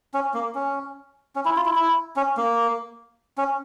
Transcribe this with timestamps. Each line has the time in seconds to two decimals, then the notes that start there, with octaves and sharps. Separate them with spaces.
0.14 C#4
0.34 A#3
0.55 C#4
1.36 C#4
1.45 E4
1.56 F4
1.66 E4
1.76 E4
2.16 C#4
2.37 A#3
3.38 C#4